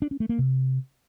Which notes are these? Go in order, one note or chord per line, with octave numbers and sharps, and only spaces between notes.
D4
C#4
A3
A#3
C3